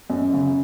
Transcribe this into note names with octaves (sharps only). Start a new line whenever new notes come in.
F#2
C#3